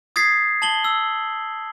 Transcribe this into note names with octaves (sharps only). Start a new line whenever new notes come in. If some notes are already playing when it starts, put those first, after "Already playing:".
D#6 G#6 A6 B6 C7
A5 F#7 G7
E6